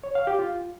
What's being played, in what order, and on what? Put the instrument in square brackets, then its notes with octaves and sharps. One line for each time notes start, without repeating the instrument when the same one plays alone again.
[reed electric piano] C#5
F5
G4
F4